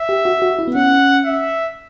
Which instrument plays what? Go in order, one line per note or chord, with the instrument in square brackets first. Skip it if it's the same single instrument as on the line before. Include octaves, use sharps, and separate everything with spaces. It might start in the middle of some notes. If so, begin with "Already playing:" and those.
Already playing: [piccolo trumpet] E5
[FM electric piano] G4
F#4
F#4
E4
B3
[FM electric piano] C#4 [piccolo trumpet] F#5
[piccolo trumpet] E5